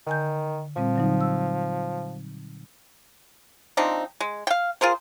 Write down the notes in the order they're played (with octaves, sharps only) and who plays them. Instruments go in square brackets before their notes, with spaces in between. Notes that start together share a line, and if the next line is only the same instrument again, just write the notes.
[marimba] D3 G#5 G6 [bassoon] D#3
[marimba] A#2 G3 C4 [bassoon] F3
[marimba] D3 F#3 D#4
E6
[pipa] F3 C4 D4 D#4
G#3
F5 G5
F4 G#4 A#4 C5